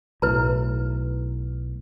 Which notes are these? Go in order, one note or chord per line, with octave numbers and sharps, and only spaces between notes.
B1 A2 E4 B4 A#5